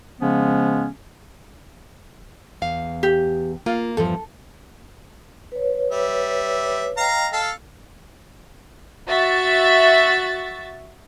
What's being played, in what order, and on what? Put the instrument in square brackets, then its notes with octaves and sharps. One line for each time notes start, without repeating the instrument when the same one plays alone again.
[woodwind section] C#3 F3 G#3 B3 C#4
[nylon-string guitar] E2 F5
[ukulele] G4
[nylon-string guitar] A#3 [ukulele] F4
[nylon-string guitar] E2 G2 F3 [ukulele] A4
[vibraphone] B4 C#5
[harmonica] G3 E5
[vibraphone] D#5 G5 [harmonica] F5 A#5
[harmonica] A4 F5 [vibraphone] E6
[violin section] F#4 E5 A6